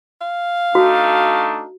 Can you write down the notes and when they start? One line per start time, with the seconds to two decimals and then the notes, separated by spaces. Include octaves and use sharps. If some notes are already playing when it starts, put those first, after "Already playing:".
0.21 F5
0.75 A3 D4 D#4 F#4